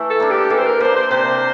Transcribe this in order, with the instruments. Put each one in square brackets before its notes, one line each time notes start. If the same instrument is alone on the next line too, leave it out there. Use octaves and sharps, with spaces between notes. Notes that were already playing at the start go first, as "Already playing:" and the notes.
Already playing: [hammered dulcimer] E3 A3 E4
[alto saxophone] A4
[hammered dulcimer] A#3 D4
[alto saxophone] G4
[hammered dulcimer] E3 [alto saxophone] A4
[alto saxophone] C5
A#4
[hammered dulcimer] A#3 D4 [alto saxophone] C5
[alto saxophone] C5
[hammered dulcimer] C3 [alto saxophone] C5